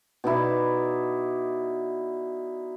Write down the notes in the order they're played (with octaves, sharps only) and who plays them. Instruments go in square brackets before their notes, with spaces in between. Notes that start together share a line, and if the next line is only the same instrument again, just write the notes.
[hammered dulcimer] B2 D#4 E4 D5